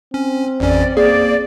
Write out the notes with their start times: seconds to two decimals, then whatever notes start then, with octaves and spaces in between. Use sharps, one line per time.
0.14 C4 C#4
0.60 A1 F2 C#4 D5
0.97 A#3 G#4 D5